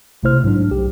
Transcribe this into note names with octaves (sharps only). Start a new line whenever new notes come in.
A#1 C3 A3 E4 C5 F6
G#2 F#3 D4
B1 G4